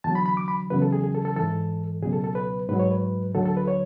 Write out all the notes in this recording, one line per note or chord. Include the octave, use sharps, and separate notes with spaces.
E2 D3 F#3 A5
B5
B5
D6
B5
E2 C#3 F#3 B4
A4
G#4
G#4
A4
A4
G#2 E3 A4
C#2 B2 F#3 G#4
A4
A4
B4
G#2 F#3 B4
C#5
B4
D2 D3 F#3 A4
A4
B4
C#5